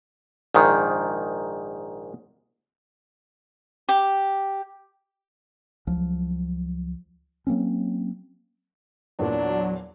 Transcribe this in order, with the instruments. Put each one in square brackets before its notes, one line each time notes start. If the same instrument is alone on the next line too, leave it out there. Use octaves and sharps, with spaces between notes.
[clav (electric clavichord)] A#1 G#2 D#3
[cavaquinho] G4
[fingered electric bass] C#2 F3 F#3
F#3 A#3 C4 C#4
[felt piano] E2 A#2 [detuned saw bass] F#3 [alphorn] D4